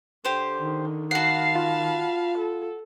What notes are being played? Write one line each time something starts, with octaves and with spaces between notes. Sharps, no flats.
D3 G4 C5
D#3
F#4 F5 F#5 A5 B5 C7
F4
A4